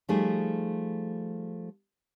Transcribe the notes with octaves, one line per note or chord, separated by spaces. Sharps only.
F3 G3 A3 D#4 G#4